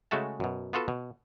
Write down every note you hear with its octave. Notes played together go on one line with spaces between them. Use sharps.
C#3 G#3 A3 F#4 E5 A5
F#2 B2
B3 F4 F#4 A4 B4
B2